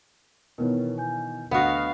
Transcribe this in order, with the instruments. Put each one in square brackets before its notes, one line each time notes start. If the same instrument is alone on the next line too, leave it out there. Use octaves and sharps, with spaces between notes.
[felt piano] B2 D#3 E3 [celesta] A#4 B4 C#5
[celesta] G#5 G6
[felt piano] D2 [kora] B3 F#4 [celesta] D#5 D#6 A#6 [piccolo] F5